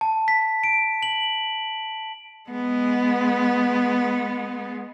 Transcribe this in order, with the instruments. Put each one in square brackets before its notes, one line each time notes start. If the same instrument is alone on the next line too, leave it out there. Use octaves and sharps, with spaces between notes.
[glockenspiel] A5
B6
D7
F#7
[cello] G#3 B3